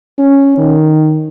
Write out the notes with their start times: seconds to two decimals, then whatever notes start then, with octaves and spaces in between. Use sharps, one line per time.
0.19 C#4
0.58 D#3